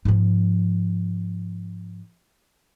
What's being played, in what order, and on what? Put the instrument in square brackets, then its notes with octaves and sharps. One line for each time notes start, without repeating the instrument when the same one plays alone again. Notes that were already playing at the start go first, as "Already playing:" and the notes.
[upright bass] G#2 F3